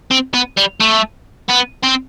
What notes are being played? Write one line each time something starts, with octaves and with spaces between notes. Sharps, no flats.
C4
B3
G3
A3
B3
C4